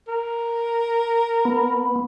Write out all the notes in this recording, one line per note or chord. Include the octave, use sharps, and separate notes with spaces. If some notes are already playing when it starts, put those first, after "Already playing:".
A#4
B3